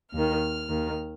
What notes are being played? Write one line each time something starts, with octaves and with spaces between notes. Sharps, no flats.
D#2 D#3 F6
D#2 D#3